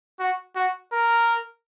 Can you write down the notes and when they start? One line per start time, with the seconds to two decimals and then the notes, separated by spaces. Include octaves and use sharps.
0.20 F#4
0.56 F#4
0.93 A#4